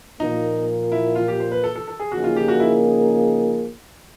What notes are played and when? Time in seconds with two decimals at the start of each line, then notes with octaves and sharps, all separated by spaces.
0.19 A#2 F3 A#3 D#4
0.92 E4
1.15 F4
1.28 G4
1.40 C5
1.52 B4
1.64 A4
1.76 A4
1.88 A4
2.00 G#4
2.11 C#3 F3 A#3 D#4 F#4 G#4
2.24 F4
2.36 G4
2.48 F#4
2.60 E4